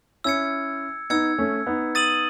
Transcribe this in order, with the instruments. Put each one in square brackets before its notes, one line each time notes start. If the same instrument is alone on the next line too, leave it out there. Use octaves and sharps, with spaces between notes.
[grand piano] C#4 E4 [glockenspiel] E6 G#6 C#7
[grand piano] B3 D#4 [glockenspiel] E6 G#6 C#7
[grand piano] A3 C#4
B3 D#4
[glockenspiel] D#6 A6 D#7 F#7